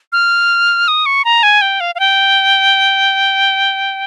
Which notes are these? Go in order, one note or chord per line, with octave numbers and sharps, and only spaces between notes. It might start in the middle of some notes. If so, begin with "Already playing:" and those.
F6
D#6
C#6
A#5
G#5
G5
F5
F5
G5